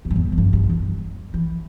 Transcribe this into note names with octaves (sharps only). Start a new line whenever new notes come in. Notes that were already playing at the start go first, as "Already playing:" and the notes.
E2
G2
E2
E2
G2
G2
E3
E3